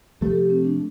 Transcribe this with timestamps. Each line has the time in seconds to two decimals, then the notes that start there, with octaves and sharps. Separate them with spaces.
0.21 C3 F3 A3 G4
0.30 A4
0.35 G4
0.50 C4
0.65 D4